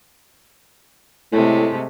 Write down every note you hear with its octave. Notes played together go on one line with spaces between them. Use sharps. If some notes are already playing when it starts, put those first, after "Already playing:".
A2 C3 G#3 A3